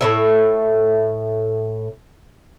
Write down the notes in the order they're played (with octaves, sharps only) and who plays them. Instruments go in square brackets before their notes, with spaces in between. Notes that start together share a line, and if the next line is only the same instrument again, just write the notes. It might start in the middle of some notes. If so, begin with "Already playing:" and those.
[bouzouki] A2 F3 E5